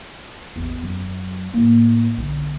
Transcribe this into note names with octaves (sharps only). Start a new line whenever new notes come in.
A1 E2
F#2 F#3
A2 A#3
B1 D3